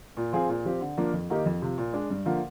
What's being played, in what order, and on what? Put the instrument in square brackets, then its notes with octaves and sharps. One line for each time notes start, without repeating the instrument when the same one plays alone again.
[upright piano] A#2
F3 C4 F4 G#4
A#2
F3 C4 G4
D3
F3 A#3 D4
F2
D#3 A#3 D#4 G4
F2
C3 F3
A#2
G#3 D4
G2
D3 F3 A#3